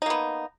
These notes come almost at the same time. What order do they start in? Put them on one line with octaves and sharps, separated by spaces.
D#4 A#3 B3